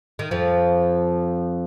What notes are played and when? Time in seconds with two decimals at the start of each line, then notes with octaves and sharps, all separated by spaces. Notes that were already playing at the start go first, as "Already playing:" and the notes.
0.19 D#3
0.31 F2 F3